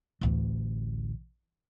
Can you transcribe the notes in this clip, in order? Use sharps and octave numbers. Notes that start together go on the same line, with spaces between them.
A1 D2